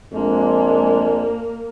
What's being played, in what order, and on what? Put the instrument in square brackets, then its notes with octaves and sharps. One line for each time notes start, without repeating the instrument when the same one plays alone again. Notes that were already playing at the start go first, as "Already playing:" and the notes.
[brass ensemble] F2 G#3 D4 [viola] A#3